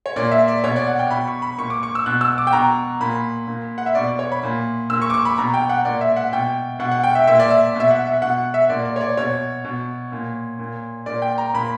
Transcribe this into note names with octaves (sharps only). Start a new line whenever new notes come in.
C#5
A#2 D5
E5
D5
B2 C#5
D5
F#5
G5
B2 B5
C#6
B5
A#2 C#6
D6
C#6
E6
B2 F#6
E6
D6
G5
B2 A#5
A#2 B5
A#2
F#5
E5
B2 D5
D5
C#5
B5
A#2
A#2 E6
C#6
D6
C#6
B5
B2 A#5
G5
F#5
A#2 D5
E5
F#5
B2 G5
B2 F#5
F#5
G5
E5
A#2 E5
D5
E5
B2
E5
F#5
E5
B2 F#5
E5
A#2 D5
D5
C#5
D5
B2 C#5
B2
A#2
A#2
A#2 D5
G5
A#5
A#2 B5